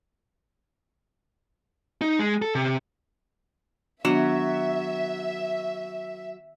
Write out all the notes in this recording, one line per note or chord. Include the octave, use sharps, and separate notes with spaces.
D#4
G#3
A4
C3
D#3 F#3 B3 D4 E5